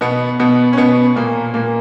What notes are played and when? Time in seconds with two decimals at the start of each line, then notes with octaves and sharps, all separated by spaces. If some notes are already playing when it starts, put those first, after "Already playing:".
0.01 B2 B3
0.40 B2 B3
0.73 C#4
0.77 B2 B3
1.16 A#2 A#3
1.54 A#2 A#3